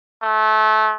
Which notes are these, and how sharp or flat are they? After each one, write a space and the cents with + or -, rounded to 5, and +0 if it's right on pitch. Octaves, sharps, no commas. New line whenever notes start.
A3 -25